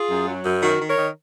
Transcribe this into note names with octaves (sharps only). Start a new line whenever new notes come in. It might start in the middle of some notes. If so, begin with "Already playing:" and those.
Already playing: F4 G#4
F#2
F#3
F#2
D#3 F#4 A#4
D#3
A#4 C#5
D#3